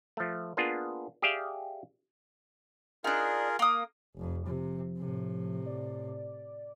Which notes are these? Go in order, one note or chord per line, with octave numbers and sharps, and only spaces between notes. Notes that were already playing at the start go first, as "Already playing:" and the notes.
F3 A3
A#3 B3 D4 F4 G#4
G4 G#4 D5 E5 F5 G5
D4 D#4 F4 G#4 A#4
A#3 D#6
F1 F2
C3 F3
A2 C3
D5